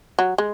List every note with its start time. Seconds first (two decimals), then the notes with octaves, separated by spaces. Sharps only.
0.19 F#3
0.38 G#3